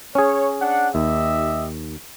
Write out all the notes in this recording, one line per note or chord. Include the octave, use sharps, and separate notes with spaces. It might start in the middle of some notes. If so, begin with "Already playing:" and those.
C#4 G#4 C#5
D4 F#5
D#2 G4 D#5 E5